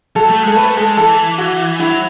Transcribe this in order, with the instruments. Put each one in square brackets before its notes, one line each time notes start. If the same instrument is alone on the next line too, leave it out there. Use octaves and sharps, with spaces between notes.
[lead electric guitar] F#3 [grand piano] A4
[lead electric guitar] A3
[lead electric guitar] G#3 [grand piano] A4
[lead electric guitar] A3 [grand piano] B4
[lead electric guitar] G#3 [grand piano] A4
[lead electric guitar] E3 [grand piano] A4
[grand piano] F#4
[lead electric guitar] F#3 [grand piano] E4